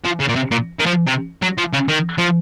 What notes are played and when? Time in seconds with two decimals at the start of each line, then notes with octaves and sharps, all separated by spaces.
0.05 F3
0.20 C#3
0.29 A#2
0.36 C3
0.51 A#2
0.79 D#3
0.86 F3
1.07 C3
1.42 F#3
1.58 F3
1.73 C#3
1.88 D#3
2.18 F3